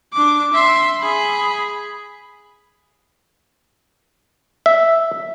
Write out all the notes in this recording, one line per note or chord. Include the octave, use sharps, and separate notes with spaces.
D4 D6
E5 C6
G#4 B5
E5